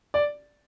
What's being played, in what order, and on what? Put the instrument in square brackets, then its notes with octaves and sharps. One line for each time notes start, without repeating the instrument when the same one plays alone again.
[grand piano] D5